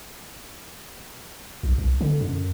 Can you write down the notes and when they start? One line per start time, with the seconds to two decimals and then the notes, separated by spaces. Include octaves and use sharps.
1.63 B1
1.78 C2
2.01 D3
2.21 F#2